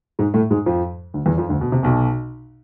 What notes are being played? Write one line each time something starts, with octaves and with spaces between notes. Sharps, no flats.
G#2 G#3
A2 A3
G#2 G#3
F2 F3
D2 D3
E2 E3
F2 F3
D2 D3
B2
C3
B1 B2